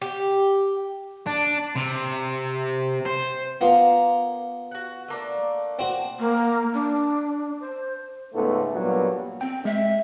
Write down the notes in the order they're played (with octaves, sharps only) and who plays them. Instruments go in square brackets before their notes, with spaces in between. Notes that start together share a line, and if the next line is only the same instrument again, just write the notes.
[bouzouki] G4
[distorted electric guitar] D4
C3
C5
[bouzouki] A#3 A#4 F5 [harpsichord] B3 F4
[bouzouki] F#4 F#5
A3 A#3 D4
[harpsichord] C4 F#4
[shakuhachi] A#3
D4
C5
[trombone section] C#2 G#2 A3 B3 A4
G2 A#2 F#3 G3 B3
[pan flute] C4 [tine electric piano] G5
[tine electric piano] G#3 [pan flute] E5